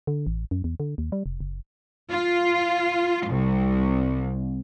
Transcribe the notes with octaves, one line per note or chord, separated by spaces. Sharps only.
D3
A1
F#2
E2
D3
D#2
G3
F1
F#1
F4
C2